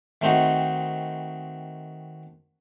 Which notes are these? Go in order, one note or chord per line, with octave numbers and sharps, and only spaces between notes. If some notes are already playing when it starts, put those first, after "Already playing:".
D#3 A3 C4 D#4 F#4